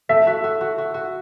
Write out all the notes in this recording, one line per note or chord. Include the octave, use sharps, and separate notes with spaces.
A3 E5
F#4
F#4
F#4
F#4
F#4